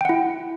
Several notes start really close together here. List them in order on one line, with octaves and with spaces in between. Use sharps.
G5 F#5 E4